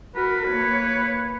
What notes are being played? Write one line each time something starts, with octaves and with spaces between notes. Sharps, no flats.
F#4 A#4 B4
A#3 C#5